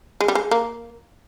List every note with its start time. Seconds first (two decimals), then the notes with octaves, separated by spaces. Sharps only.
0.20 G#3
0.28 G3
0.35 G#3
0.51 A#3